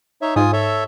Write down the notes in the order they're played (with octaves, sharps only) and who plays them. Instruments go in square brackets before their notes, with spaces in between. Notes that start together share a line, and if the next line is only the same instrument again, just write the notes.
[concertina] D#4 C#5 E5
[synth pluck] G#2 [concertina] F4 G#5 D#6
[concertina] A4 C#5 E5